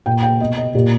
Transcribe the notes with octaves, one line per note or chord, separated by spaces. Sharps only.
A#2 G5
G5
B2 D#5
D#5
A#2 G4